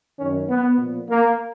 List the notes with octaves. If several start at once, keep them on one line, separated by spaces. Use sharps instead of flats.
F#2 D#3 C#4
B3
A#2 F3
A#3